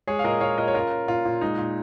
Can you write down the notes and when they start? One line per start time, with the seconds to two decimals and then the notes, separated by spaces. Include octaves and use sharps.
0.07 G#3 G#4 C#5
0.19 F5
0.24 A#2 A#4 D#5
0.41 A#2 C#5 F5
0.58 A#2 A#4 D#5
0.68 C#5
0.74 C#4 F4 A#4
0.92 C#4
1.08 A#2 F4
1.25 A#2
1.41 G#3 D#4
1.58 A#2